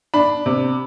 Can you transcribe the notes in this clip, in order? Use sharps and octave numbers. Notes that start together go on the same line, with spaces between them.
D4 B5
C3